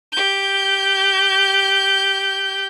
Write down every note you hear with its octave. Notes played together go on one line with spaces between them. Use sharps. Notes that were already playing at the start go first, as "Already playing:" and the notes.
G4 G6